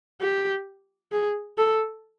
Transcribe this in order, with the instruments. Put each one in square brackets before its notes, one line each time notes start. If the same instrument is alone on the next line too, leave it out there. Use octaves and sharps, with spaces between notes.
[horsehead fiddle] G4
G#4
A4